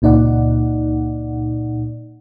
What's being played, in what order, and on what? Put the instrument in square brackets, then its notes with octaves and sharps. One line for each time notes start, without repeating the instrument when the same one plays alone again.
[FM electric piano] C#2 A#2 D#4 D5 F#5